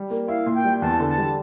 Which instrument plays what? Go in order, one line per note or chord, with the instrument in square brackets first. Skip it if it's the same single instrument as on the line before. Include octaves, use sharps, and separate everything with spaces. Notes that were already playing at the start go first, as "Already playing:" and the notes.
Already playing: [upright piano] G3
A#3
[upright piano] E4 [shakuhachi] F5
[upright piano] A#2
[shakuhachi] G5
[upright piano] G3
[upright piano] E2 [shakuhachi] A5
[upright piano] D3
[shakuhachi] A5
[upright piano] G3